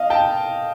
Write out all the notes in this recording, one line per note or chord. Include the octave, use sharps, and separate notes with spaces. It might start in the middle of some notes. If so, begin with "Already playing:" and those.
Already playing: D#5 F5
G5 A5